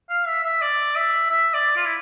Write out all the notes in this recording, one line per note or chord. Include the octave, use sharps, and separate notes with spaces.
F5
E5
E5
D5
E5
E5
D5
F4
E4